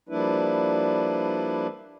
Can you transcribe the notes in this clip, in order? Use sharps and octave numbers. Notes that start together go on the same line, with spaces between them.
F3 G3 A#3 D4 E4 B4